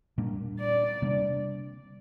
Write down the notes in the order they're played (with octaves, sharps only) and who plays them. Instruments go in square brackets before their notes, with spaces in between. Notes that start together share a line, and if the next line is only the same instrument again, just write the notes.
[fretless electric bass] A#2 G3 A#3 D4
[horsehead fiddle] D5
[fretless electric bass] C3 G3 A#3 D4